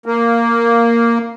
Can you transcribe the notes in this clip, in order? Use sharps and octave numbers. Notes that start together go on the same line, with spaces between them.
A#3